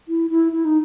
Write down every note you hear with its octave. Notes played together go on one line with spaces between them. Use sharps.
E4
E4
E4
D#4